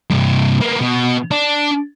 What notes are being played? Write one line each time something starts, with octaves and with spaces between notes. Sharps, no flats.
G2 C3
A#3 B3
B2
D4